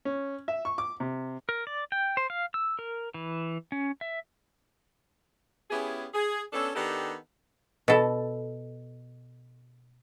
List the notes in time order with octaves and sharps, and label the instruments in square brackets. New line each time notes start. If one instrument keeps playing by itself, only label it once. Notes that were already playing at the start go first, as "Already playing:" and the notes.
[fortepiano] C#4
E5
C#6
D6
C3
[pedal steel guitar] A#4
D5
G5
C5
F5
E6
A#4
E3
C#4
E5
[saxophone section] B3 C#4 E4 G4 G#4
G#4
B3 C#4 D4 A4
D#3 B3 D4 D#4 G4 A4
[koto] B2 A4